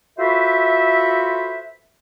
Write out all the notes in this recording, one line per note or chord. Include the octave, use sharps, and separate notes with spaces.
F4 F#4 A4 B4 C5 E5